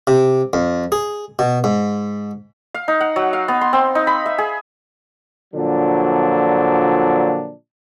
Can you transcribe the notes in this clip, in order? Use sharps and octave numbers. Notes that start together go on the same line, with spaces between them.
C3
F2
G#4
B2
G#2
F5
D#4
F#5
F#3
F5
B3
C6
C4
D#4
B5
E5
G#4
A#2 D3 F3 F#3 D4